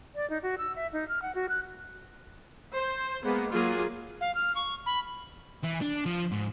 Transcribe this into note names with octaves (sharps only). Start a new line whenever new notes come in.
D5
D#4
F#4
E6
E5
D#4
F6
F#5
F#4
F#6
C5
G#3 A#3 B3
F#3 A#3 F4 G#4
F5
F6
C#6
B5
E3
D4
F3
G#2